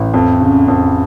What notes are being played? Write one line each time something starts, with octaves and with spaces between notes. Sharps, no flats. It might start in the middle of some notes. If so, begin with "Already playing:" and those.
Already playing: A1
F2
C#3
F2